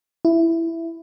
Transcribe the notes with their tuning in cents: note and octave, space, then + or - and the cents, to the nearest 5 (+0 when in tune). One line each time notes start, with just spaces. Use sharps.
E4 +10